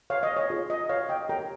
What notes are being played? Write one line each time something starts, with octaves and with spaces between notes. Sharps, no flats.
C#5 F5
D#5
C#5
F4 G#4 C#5
D#5
C#5 F5
D#5 G5
G4 A#4 C#5 G5 A#5